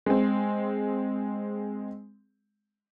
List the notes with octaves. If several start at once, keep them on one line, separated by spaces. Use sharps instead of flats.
G#3 C4